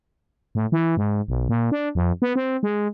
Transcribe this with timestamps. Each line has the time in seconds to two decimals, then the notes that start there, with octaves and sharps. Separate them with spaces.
0.55 A2
0.72 E3
0.97 G#2
1.28 B1
1.49 A#2
1.72 D4
1.95 F2
2.22 B3
2.36 C4
2.63 G#3